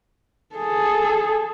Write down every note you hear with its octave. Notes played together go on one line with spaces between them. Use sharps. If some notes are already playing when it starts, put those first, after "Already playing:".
G#4 A4